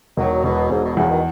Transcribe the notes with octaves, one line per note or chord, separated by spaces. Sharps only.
E1 D#3 F#3
E1 B2
E1 G#2
B2
E2 A2 C#3
B2 D#3